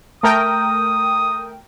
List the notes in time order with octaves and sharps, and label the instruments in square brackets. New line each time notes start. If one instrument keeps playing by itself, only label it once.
[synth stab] A3 A#4 G5 [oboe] D#6